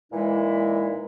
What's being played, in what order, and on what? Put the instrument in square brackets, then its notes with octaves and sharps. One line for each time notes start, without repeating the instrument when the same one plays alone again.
[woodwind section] A#2 E3 G#3 D#4 E4